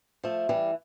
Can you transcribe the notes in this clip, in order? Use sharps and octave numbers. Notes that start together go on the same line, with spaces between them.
F3 A3
E3 G3